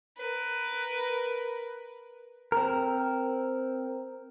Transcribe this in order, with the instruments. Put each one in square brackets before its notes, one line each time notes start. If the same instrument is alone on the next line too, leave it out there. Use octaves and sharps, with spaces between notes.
[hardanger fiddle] A#4 B4
[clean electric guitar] C4 A#4